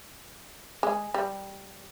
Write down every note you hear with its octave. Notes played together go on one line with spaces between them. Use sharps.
G#3
G3